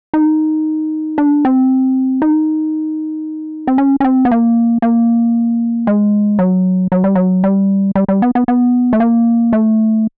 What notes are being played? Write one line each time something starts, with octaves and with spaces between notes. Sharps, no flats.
D#4
D4
C4
D#4
C4
C#4
C#4
C4
B3
A#3
A#3
G#3
F#3
F#3
G3
F#3
G3
G3
G3
B3
B3
B3
A3
A#3
A3